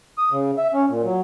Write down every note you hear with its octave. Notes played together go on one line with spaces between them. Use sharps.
D#6
C#3
E5
C#4
A#2
F#3